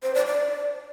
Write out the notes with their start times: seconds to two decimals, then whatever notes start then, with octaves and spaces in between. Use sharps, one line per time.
0.03 C5
0.15 D5
0.26 D5